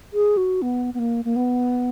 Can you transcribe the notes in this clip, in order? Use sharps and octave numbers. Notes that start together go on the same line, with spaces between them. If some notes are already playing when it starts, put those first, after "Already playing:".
G#4
F#4
B3
B3
A#3
A#3
B3